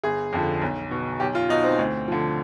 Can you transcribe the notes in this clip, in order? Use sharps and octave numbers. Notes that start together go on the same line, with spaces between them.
G1 G#4
F2 D3 F3
B1
B2
B1 G4
F4
B2 D#4
C4
D2
D3 F3